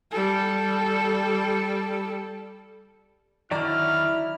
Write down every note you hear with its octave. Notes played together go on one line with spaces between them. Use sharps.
G3 A4
D3 D#3 F#3 E4 D5 A#5 F6